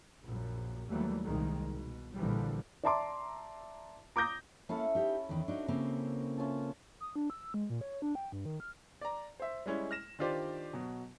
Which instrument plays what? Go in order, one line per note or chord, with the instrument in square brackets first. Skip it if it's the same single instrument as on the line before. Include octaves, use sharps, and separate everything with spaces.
[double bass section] A#1 F#2
D#2 E3 F#3 G3 A3 A#3
C2 A#2 D#3 G#3
B2
A#1 A#2 D3 E3 F3 G3
[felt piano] D5 E5 A5 A#5 C6 D6
A#5 D6 D#6 G6 A#6
[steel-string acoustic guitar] A#3 F5 F#5 [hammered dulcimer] C#4 E4 A4
[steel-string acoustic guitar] D#4 G4
E2 D#3
[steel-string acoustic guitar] D4 D#4 [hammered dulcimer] F#4
[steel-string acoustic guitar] C#3 A#3 C4
[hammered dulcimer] C#4 F4 A5
[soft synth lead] D#6
D4
E6
G#3
A#2
C#5
D4
G5
G2
D#3
F6
[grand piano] D5 A#5
C5 E5
G3 G#3 C#4 E4
F6 A#6 E7
D#3 D4 F4 G4 C5 D5
B2 F#3